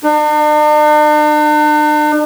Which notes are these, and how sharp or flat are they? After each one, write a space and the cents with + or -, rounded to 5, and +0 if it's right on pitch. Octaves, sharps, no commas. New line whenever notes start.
D4 +45